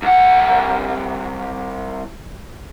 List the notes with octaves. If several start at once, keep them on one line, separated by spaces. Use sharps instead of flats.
C2 F#5